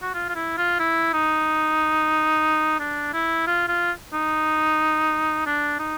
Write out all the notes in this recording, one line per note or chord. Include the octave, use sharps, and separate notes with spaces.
F#4
F4
F4
E4
F4
E4
D#4
D4
E4
F4
F4
D#4
D4
D#4